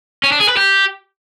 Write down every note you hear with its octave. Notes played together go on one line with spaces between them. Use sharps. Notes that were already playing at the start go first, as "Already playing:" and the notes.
C#4
D4
G#4
B4
G4